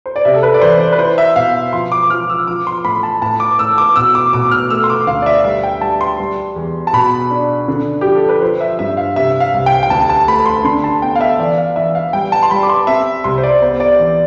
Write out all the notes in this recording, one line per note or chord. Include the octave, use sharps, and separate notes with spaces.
C5
D5
C3 E5
A4
B4
D5
E3 C5
D5
B4
E4 C5
E5
B2 F5
F3 C6
D6
F3 F6
E6
F3 D6
C6
A2 B5
A5
A2 A5
D6
A2 E6
D6
B2 E6
D6
B2 D6
F6
A3 E6
C6
D6
D2 F5
D5
E5
G3 E5
G5
G3 A5
C6
G3
E2
A5
B2 B5
D4
D3
F3 G4
A4
B4
F3 C5
E5
G2 E5
F5
C3 E5
F5
C2
G5
G5
D2 A5
A5
A3 B5
C6
D3 C6
A5
B3 G5
F5
E5
E3 D5
F5
E3 E5
F5
G3 G5
A5
C6
G3 B5
D6
C6
C4 E5
C2 C6
C5
D5
B3 C5
D5
E3